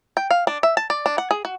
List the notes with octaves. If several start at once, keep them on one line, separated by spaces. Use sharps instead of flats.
G5
F5
D4
E5
A5
D5
D4
F#5
G#4
F#4